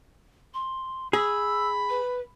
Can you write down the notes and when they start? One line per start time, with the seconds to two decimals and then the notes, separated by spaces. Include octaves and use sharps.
0.54 C6
1.13 G#4 B5 E6
1.90 B4